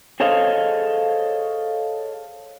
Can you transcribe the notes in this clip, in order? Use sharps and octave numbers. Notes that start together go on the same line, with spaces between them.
G#4 A4 C5 C#5 D#5 F5